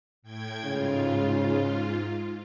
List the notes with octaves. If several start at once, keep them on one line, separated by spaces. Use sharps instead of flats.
A2 G5 G#6
G#2 C#3 F4